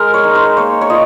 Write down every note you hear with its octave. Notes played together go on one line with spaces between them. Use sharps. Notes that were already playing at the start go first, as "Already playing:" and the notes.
Already playing: G#3 A#4
C#5
D#4
C5
A#3 C#5
C#5
F4 D#5